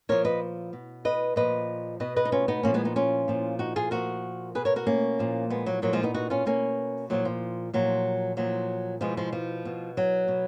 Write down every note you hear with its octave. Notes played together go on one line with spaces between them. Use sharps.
A#2 F3 A#4 C#5
B4 D#5
B2
B4 D#5
A#2 F3 B4 D#5
B2 B4 D#5
B4 D#5
D#4
C#4 F4
B3 D#4
A#2 F3 A#3 C#4
G#3 B3
B3 D#4
C#4 F4
A#2 F3
D#4 F#4
F4 G#4
A#2 F3 F#4 A#4
B2 G#4 B4
A#4 C#5
F#4 A#4
A#3 C#4
A#2 F3
G#3 B3
F#3 A#3
A#2 F3 F#3 A#3
F3 G#3
B3 D#4
D#4 F#4
C#4 F4
B2 A#3 C#4
A#2 F3 F#3
F3
A#2 F3 F#3
A#2 F3 F#3
B2 F3 G#3
F3 G#3
F3
B2
F#3
B2